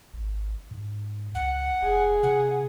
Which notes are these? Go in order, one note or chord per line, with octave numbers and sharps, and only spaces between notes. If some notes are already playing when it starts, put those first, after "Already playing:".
G#1
G#2
C#2 F#5
F1 G#4
C3 F#5